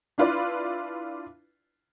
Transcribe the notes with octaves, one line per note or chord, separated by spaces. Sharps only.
D4 E4 F4 B4 D5